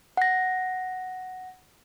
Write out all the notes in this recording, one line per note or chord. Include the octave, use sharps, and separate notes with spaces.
F#5 A#6